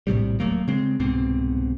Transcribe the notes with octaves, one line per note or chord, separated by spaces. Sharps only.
A#1 A2 C3 G3
D#1 F#3 A3 A#3
C#3 G#3 C4
C2 G#2 B2 C4